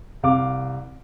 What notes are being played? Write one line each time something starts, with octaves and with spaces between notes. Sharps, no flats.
C2 F5 D6